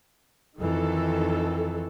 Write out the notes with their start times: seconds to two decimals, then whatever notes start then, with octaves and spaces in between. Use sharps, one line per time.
0.59 F2 D#3 E3 A4